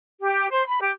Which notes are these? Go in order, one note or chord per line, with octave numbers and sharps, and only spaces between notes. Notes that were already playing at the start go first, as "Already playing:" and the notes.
G4
C5
B5
G4